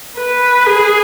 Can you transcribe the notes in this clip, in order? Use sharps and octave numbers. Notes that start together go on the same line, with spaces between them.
B4
G#4